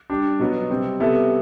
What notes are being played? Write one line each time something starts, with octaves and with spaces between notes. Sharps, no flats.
G3 D4 G4
B2 F#3 B3 F#4
C3 G3 C4
C3 G3 B3 E4 A4